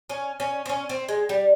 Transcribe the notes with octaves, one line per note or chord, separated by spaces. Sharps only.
C#4
C#4
C4
C#4
C4
G#3
G3